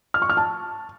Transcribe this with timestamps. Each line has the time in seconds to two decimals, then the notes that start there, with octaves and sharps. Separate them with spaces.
0.14 F6
0.22 C#6
0.29 F6
0.37 A5